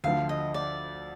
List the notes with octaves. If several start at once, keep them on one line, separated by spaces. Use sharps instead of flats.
D2 D3 F3 F5
D#5
D5